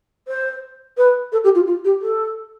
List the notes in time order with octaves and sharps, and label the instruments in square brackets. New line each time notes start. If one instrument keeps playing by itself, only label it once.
[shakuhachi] C5
B4
A4
G4
F4
F4
G4
A4